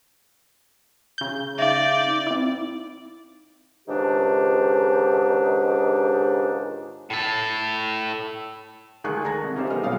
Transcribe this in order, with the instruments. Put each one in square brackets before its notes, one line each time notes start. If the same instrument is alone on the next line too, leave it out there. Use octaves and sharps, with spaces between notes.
[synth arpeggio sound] C#3 G6
[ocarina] D#4 [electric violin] D5 [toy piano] E5 F5
[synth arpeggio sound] C4 E4
[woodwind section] C#2 G#2 D#3 D4 G4
[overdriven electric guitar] A2 A4
[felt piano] D2 D#3 G#3 G#4 C#6 F#6
A5 A#5 G#6 A#6
C2
C#4 D#4 G4 A4 C5 E5
D#3 G#3 B3 D#5 F6
B1 A#2 F#3 C#5 F5 D#6